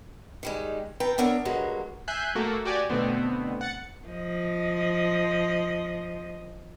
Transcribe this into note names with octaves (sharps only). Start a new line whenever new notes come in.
D#3 G3 G#3
A4 B4 F5 G5 A#5
B3 D4 A#4 C#5 E5
G2 F#3 G#3 A#3 F#4
E5 G#5 F#6 G6 C7
A3 A#3 F#4 A4
F#4 G4 D5 G#5
B2 D3 A3 B3 C4
F#5 A6 C#7
F3 D#5